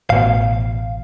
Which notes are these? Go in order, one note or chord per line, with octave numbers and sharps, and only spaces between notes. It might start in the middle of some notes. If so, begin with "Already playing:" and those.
A1 B2 F5